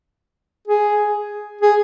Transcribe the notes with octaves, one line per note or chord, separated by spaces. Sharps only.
G#4
G#4